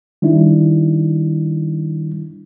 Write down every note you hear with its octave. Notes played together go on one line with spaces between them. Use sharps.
D#3 G3 D4 E4